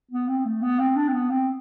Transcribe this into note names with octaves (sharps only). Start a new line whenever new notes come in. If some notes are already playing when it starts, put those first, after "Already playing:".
B3
C4
A3
B3
C4
D4
C4
B3
C4